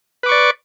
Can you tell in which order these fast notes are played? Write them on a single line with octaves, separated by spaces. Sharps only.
B4 D6 C#6 D5